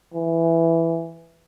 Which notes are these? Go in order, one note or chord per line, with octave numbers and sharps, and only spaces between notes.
E3